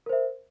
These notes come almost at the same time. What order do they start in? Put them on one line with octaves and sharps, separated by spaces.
A#4 C5 E5